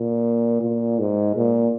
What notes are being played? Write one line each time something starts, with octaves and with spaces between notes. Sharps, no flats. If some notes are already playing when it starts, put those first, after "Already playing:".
Already playing: A#2
A#2
G#2
A#2